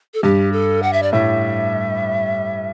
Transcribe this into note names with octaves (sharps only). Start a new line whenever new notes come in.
A4
G2 G4
A4
F#5
E5
D5
A2 E5